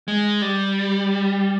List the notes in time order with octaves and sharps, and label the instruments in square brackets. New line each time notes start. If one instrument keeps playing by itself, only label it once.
[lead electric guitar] G#3
G3